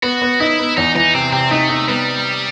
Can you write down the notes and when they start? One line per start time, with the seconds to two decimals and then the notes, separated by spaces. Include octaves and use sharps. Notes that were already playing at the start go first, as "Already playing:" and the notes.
0.03 B3 F#4
0.22 B3
0.40 D#4 E4
0.59 B3
0.77 E2 D#4
0.95 E3 D#4
1.14 C3 C4
1.32 C3 C4
1.51 A3 D#4
1.69 D#4
1.88 G3 B3